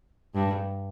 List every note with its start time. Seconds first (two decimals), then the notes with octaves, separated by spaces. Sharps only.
0.35 G2